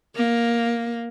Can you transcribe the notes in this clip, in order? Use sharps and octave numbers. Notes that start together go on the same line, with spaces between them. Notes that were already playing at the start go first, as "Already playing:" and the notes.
A#3